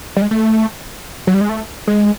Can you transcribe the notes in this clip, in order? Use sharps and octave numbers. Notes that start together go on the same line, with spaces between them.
G3
G#3
A3
F#3
G3
G#3
A3
G#3